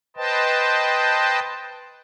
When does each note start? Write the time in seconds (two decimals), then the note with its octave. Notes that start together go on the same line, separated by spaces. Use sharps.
0.17 B4 C5 D#5 G5 A5